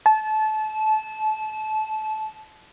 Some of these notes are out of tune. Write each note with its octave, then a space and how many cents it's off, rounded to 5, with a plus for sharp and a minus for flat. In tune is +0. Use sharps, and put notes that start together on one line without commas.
A5 -25